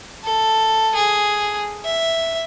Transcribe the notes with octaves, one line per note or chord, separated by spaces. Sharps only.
A4
G#4
E5